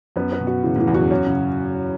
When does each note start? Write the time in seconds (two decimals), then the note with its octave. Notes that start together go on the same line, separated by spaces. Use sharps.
0.16 F#2 B3
0.32 B3
0.40 B2
0.47 F#4
0.63 C#3 E3
0.76 A2 E3
0.87 E2
0.94 F#2 F#4
1.10 F#2 C#4
1.26 C#3